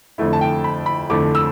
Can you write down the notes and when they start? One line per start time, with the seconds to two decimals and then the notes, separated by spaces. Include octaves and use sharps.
0.18 F2 D3 A3 E4
0.33 A5
0.41 G5
0.64 B5
0.86 B5
1.10 F2 D3 A3 E4 D6
1.35 E6